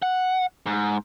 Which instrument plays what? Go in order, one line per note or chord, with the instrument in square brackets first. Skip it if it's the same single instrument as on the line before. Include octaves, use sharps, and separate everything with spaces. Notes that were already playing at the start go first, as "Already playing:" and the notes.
[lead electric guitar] F#5
G#2